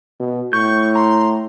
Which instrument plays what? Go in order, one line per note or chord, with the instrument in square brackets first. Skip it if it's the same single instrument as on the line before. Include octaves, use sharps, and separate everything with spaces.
[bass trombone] B2
[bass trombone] A2 [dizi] C#6 [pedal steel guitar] G6
[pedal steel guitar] A#5 [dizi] C6